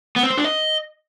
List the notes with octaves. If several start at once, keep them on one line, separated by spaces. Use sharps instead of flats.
B3
C4
C5
D4
D#5